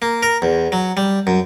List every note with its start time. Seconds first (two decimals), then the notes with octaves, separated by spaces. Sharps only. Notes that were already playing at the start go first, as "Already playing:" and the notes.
0.02 A#3
0.23 A#4
0.42 E2
0.72 F#3
0.97 G3
1.27 F#2